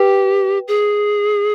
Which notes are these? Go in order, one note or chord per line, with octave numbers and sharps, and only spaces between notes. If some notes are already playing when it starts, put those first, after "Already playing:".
Already playing: G4 B4 G5
G#4